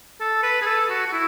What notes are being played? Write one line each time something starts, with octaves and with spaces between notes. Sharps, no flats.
A4
B4
G#4
A4
F#4
F#4
E4